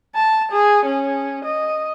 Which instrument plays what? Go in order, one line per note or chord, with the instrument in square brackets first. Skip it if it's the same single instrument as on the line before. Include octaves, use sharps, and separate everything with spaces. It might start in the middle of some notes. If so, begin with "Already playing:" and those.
[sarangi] A5
G#4
C#4
D#5